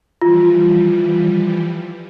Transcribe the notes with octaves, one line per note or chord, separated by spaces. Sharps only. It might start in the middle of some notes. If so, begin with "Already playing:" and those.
E3 F3 G3 F4